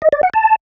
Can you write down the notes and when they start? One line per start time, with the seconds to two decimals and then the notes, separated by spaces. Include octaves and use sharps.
0.02 D#5
0.12 D5
0.23 F#5
0.34 A5